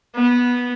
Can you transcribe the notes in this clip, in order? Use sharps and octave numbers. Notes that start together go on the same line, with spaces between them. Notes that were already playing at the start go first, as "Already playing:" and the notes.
B3